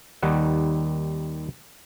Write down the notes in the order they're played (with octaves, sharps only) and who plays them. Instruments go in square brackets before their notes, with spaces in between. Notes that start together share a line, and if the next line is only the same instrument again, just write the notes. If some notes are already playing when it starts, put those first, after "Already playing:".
[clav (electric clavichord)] D#2 D#3 G3 F#5